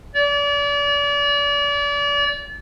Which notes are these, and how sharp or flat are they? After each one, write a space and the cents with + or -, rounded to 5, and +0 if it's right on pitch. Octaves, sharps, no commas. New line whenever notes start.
D5 -35